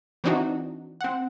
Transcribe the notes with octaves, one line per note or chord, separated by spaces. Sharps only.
E3 C4 D4 D#4 F#4
C4 F#5